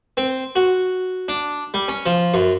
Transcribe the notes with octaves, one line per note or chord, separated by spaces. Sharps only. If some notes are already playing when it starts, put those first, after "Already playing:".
C4
F#4
D4
G3
C#4
F3
F#2